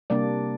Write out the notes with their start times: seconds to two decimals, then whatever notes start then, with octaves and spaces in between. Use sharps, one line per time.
0.10 C3 G3 A#3 D4 D5